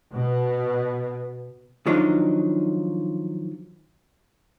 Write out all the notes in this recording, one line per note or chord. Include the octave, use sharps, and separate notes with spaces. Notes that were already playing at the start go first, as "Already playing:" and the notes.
B2
D#3 F3 F#3 D4 D#4